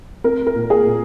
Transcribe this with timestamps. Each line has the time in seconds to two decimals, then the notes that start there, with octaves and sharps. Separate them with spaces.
0.24 C4 A#4
0.47 A#4
0.55 A#2
0.70 G#4
0.85 A#2